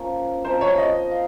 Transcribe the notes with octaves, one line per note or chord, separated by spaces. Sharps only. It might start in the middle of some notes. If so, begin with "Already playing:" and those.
Already playing: F3 A#3 C#4 F4
F3 C4 D#4 A#4 C5
C#5
D#5
F5